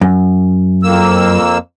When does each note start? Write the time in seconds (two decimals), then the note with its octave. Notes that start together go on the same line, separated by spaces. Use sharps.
0.01 F#2
0.83 F2 A#3 E6